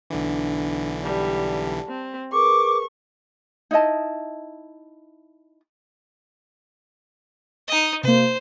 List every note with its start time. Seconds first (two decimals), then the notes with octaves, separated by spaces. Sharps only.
0.10 B1 D3 E3 D4
1.03 G3 A5
1.88 C4
2.32 G#4 A#4 B4 C#6 D6
3.71 D#4 E4 D#5 A5
7.68 D#4 D#5
8.03 C3 A#3 C5